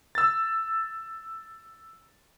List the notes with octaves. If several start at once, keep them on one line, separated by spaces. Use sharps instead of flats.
E6 A6